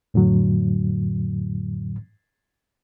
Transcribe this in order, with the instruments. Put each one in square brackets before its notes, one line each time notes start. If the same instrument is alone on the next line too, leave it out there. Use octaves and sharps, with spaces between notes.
[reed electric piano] F2 A2 D3 F#3